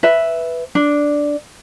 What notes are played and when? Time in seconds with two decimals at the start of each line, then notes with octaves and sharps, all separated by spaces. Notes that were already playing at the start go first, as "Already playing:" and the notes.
0.03 B4 E5
0.75 D4